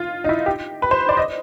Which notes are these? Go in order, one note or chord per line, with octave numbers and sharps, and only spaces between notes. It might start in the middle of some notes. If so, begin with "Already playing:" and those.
Already playing: F4
D#4
E4
G4
B4
C5
D5
D#5